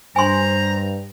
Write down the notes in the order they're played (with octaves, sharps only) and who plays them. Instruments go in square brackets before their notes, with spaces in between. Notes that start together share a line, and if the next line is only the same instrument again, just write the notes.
[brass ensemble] G2 [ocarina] C5 [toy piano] G#5 C6 [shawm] A#5